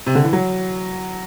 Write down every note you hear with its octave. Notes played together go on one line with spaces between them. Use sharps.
C3
D3
E3
F#3